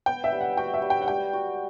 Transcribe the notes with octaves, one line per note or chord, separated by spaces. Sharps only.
B3 G5
E5
G3
F#5
F#4 G5
E5
G3
G5
F#5
G3 G5
F#4